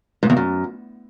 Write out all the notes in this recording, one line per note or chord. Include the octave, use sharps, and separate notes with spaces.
G#2
E2
F#2